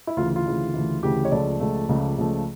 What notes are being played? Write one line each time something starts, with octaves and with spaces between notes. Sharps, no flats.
E4
D2 C#3 E3 F4
F4
D2 C#3 E3
D2 C#3 E3
D2 C#3 E3 G4
C#5
C#2 C#3 F3 A3 D5
C#2 C#3 F3 A3
C#2 C#3 F3 A3
C#2 C#3 F3 A3